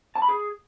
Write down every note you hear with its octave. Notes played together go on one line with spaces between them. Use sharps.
A5
B5
G#4